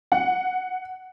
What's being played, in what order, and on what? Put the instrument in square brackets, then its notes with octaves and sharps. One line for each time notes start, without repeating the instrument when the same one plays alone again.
[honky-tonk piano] F#5